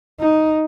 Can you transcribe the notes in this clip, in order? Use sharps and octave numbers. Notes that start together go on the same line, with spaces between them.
D#4